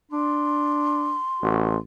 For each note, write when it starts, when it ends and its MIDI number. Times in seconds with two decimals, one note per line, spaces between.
0.11 1.17 62
0.11 1.78 84
1.42 1.78 33
1.42 1.73 66